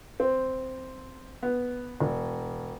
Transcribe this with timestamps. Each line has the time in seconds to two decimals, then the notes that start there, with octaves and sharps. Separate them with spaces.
0.20 C4
1.43 B3
2.00 E1